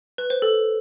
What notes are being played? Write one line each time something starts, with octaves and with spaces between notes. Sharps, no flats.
B4
C5
A4